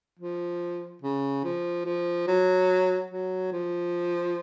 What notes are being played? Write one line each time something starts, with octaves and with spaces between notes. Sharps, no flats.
F3
C#3
F3
F3
F#3
F#3
F3